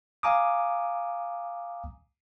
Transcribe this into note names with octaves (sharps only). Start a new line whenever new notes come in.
F5 G#5 A#5 D6 D#6